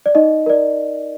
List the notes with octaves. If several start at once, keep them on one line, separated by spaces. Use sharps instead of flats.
D5
D#4 D#5
A#4 D5